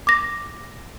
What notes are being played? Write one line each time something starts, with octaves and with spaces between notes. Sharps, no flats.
D6 A#6